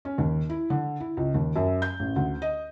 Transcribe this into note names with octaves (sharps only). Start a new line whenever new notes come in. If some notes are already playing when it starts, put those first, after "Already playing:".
C#4
D#2
E4
D3
E4
C#2
D#2
F#2
G6
A1
D2
D#5